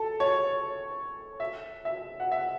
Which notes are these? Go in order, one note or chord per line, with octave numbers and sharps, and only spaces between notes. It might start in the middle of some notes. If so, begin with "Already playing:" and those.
Already playing: A4
C#5
E5
E5
F#5
E5